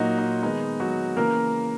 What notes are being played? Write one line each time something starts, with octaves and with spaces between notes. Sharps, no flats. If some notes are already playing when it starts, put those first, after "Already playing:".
Already playing: A#2 F#3 A#3 D#4 F#4
D#4
D#3 G#3 B3 D#4
F#3 F#4
C#3 E3 A#3 A#4